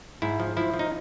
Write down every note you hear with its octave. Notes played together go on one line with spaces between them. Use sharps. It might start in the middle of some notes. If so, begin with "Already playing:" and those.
G#2 E4
F3
F3 E4
F3
D#4